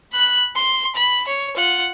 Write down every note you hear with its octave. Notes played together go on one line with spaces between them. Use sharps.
B5 F#6
C6
B5
C#5
F4 F#5